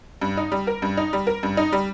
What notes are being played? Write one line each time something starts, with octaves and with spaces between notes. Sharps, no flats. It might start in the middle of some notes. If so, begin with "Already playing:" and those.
G2
D#4
G3
A#4
G2
D#4
G3
A#4
G2
D#4
G3